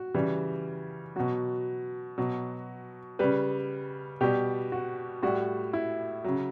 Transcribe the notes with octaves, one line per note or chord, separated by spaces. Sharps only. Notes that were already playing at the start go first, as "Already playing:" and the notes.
Already playing: F#4
C#3 E3 G3
B2 F#3 F#4
B2 F#3
C#3 G3 B4
B2 G3 G4
F#4
A2 G3 F#4
E4
C#3 F#3